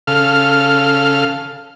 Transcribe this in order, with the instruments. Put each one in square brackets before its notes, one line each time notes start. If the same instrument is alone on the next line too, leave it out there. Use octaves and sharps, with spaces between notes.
[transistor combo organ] C#3 A4 F5 F6